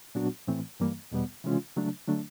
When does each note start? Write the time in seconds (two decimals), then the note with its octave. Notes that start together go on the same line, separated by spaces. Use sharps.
0.15 A#2 F#3 B3 D4 F#4
0.48 A2 E3 A3 C4
0.80 G2 E3 G3 A#3
1.12 E2 B2 G3 B3
1.44 C3 E3 G#3 C#4 F4
1.77 C#3 F#3 A3 D4
2.08 D3 F#3 A3 D4